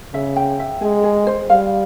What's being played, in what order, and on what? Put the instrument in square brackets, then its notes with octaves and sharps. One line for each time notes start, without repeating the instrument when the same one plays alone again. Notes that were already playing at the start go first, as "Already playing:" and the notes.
[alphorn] C#3 [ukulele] E5
[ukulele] G5
E5
[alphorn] G#3 [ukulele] G#4
[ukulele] G#4
C5
[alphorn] G3 [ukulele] F5